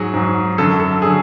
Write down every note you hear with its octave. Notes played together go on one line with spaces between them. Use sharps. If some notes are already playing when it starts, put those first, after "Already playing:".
Already playing: G#2 F#3 G#4
G#2 F#3
F#2 D3 F#3 A4
A4
D3 F#3 G#4